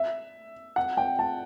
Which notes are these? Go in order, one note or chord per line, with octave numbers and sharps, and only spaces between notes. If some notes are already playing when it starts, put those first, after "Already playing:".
Already playing: E5
F#5
G5
A5